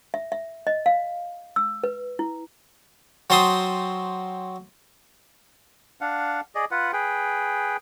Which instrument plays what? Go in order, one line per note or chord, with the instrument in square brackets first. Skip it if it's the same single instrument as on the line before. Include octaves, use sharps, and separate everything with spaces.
[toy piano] E5
E5
D#5
F5
E6
B4
E4
[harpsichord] F#3 C4 A5 C6 D#6
[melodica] D4 F5 F#5
G#4 D5 D#5
F4 B4 F#5
G#4 B4 G5